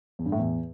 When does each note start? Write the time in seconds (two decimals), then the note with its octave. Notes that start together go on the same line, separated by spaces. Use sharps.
0.19 E2
0.26 G2
0.32 A2
0.39 E2